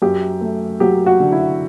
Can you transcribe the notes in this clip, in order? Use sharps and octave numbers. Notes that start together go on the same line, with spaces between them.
F#2 G4
A3
F#3 G4
F#4
D3
E4